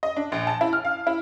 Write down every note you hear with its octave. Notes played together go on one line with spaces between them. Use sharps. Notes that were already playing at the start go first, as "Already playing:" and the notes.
D#5
D4
A#1
A5
E4
F6
F5
E4